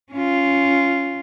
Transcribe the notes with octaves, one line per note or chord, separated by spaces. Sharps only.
C#4 F4